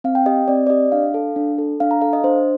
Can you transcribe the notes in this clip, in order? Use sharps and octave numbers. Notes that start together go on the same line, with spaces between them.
C4 F5
G5
G4 D#5
C4 D5
D5
G4 D#5
D4 F5
A4
D4
A4
D4 F5
A#5
A4 F5
D#5
D4 C5